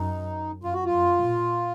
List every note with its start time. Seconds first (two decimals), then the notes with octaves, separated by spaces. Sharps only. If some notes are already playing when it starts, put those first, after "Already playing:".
Already playing: F#2 D#4
0.63 F#2 F4
0.74 F#4
0.85 F4
0.93 F#2
1.23 A#2